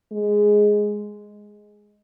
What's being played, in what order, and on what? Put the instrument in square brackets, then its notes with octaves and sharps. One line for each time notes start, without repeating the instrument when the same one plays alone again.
[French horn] G#3